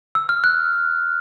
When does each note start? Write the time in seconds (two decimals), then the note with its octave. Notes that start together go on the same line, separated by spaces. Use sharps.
0.15 E6
0.29 F6
0.44 F#6